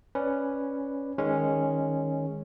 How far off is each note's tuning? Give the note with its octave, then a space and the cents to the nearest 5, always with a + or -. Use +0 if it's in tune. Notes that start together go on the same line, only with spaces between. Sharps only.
C#4 +0 B4 +0 D5 +5
D#3 +0 G#3 -10 C#4 -5